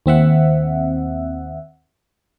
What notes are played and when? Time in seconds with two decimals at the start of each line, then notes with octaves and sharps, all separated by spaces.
0.06 D#2 C4 E5 F#5